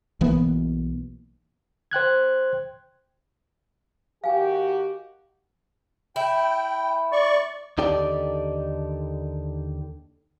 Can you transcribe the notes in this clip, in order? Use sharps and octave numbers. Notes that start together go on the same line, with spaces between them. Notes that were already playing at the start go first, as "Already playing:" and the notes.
B1 E3 A#3 B3
C5 G5 F#6 G#6
D#3 F#4 G4 F5 G#5
E4 G5
D5 C#6
D#2 D3 D#4 G4 A4 D5